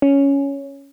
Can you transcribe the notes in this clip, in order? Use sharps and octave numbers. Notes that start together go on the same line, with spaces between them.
C#4